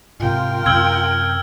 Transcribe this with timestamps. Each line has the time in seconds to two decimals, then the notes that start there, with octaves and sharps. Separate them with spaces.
0.20 G#2 C3 F4 A#4 G5
0.66 F#2 C3 E6 F6 G#6